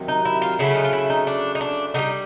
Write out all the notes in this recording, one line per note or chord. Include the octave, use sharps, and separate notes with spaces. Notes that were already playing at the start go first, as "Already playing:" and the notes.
Already playing: C3 D#3 F#3
D#4
E4
F4
C#3 F#3 A3 E4
D#4
F4
E4
D#4
D4
D#4
D4
D3 G3 D#4